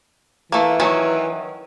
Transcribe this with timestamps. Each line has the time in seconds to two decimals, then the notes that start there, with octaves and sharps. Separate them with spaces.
0.52 E3 A3 A#3
0.80 D#3 F#3 C#4